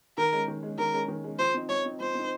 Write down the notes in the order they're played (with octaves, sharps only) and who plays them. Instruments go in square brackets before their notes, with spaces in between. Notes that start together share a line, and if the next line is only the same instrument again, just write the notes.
[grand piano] D#3 [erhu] A#4
[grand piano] G#3 C#4
D#3
G#3 C#4
[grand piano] D#3 [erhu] A#4
[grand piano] G#3 C#4
D#3
G#3 C#4
[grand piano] F3 [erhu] C5
[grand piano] C4 D#4
[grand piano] F3 [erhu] C#5
[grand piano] C4 D#4
[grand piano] F3 [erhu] C5
[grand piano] C4 D#4